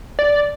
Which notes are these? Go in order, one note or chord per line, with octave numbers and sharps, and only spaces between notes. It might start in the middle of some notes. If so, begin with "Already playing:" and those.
D5